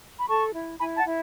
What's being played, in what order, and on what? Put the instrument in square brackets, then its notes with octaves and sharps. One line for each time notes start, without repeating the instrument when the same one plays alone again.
[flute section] B5
A4 A5 C#6
E4
E4 G#5 B5
F#5 A5
E4